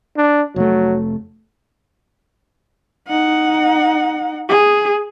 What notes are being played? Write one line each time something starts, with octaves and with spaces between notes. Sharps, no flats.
D4
F1 F#3 A3
D#4 F#5
G#4